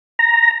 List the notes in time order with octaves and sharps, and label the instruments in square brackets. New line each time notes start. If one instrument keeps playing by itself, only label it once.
[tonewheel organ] A#5